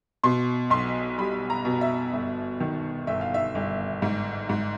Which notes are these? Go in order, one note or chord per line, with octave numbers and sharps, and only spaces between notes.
B2 C6
B1 C6
G3 B5
A#5
B2
E5
G1
D#3
G1 E5
F5
E5
G1
G#2
G#2